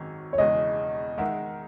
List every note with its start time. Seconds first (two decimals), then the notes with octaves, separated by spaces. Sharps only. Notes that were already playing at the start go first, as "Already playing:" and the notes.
Already playing: G#1 F#2 D#3 G#3 C#4
0.33 C#5
0.38 E1 E2 C#3 E3 G#3 D#5
1.18 D#3 G#3 D#4 A#4 E5 F#5